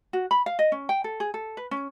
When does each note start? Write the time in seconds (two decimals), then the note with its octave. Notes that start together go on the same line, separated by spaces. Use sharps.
0.13 F#4
0.31 B5
0.46 F5
0.59 D#5
0.72 C#4
0.89 G5
1.04 A4
1.20 G#4
1.34 A4
1.57 B4
1.71 C#4